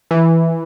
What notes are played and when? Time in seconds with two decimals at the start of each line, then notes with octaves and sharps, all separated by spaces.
0.11 E3